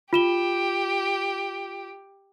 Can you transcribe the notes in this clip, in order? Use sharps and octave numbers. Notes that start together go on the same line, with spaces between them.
F4 G4 E7 G7